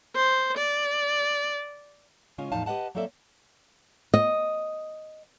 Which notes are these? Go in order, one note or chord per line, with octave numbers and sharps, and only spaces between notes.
C5
D5
C#3 G#3 C#4 F4
E2 A2 F3 D#4 F5 A5
G4 B4 D#5 F#5 A5
F#3 A#3 C4 A4 D5 E5
D#5